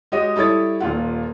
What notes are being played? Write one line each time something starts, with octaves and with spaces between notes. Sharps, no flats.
G#3 F#4 G4 C#5 D#5
G3 E4 A4 C#5 D#6 A6
D#1 A#2 F4 F#5